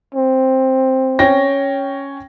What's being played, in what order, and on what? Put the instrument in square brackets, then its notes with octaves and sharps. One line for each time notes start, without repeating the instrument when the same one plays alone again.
[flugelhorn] C4
[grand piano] C#4 G5 A#6